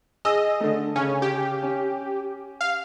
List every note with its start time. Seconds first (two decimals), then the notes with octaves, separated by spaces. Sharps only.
0.25 G#4 D#5 E6
0.60 D3 A3
0.96 C#3 C#4
1.22 G4
1.62 C#4
2.61 F5